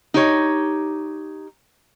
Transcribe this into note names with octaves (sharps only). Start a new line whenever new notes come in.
D#4 G4 C#5